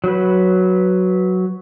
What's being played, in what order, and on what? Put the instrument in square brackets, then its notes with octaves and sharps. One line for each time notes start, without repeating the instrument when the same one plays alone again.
[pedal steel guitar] F#3 B4